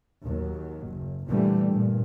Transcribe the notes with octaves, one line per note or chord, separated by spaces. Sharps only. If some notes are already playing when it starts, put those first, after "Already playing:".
D#2 F#3
F#1
A#2 D3 E3 G3 A3
G2 A#2